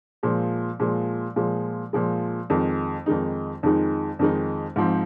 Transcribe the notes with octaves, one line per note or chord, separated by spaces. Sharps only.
A#2 F3 G#3
A#2 F3 G#3
A#2 F3 G#3
A#2 F3 G#3
F2 D#3 G#3 D#4
F2 D#3 G#3 D#4
F2 D#3 G#3 D#4
F2 D#3 G#3 D#4
G#2 F3 C4